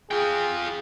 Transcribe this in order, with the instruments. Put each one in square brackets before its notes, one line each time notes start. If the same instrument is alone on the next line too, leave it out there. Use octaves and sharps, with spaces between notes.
[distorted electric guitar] F4 G5 [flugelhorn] G#4